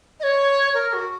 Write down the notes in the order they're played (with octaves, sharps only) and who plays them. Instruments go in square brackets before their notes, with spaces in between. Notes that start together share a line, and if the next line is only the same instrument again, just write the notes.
[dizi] D#5
C#5
A#4
F#4